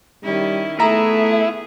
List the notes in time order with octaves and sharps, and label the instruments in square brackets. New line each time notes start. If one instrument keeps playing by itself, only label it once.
[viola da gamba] D#3 C#4 E4 [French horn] G3
[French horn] A3 [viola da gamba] B3 G#4 [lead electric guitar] E4 [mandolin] A#5